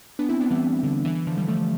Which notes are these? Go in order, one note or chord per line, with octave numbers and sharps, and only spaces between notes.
B3 D4
C4 E4
B3 D4
E3 G3
D3
E3
E3
D3 F3
E3 G3
F3 A3